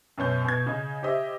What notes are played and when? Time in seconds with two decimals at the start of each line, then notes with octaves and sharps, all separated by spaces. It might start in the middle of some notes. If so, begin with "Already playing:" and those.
0.18 F#2 B2 C#4 G6
0.45 B2 G#6
0.66 C#3 D#5
1.03 G4 C5 D#5 E5